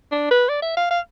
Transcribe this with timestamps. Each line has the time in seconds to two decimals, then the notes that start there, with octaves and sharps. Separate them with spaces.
0.11 D4
0.31 B4
0.49 D5
0.62 E5
0.77 F5
0.91 F5